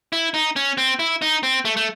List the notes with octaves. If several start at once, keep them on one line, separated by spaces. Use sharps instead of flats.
E4
D#4
C#4
C4
E4
D#4
C4
A3
A3